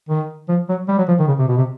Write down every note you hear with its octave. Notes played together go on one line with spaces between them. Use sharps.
D#3
F3
F#3
G3
F#3
F3
D#3
C#3
C3
B2
C3